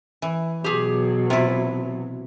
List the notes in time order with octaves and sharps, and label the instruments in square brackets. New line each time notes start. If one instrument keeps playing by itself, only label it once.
[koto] E3
[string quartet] B2 F#3 [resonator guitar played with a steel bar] G4 G#4
[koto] C3 E4 [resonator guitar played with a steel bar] F4